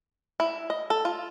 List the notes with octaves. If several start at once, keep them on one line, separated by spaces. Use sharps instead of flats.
E4
D#5
A4
F4